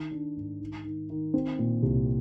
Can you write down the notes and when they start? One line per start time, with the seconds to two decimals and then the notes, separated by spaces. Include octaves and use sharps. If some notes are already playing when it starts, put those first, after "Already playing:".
Already playing: D#3
0.11 D4
0.37 G#2
0.60 D#3
0.85 D#3
1.10 D#3
1.34 C4
1.59 A#2
1.83 C2